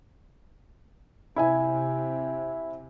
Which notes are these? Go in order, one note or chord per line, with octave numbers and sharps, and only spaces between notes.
C3 E4 E5 G#5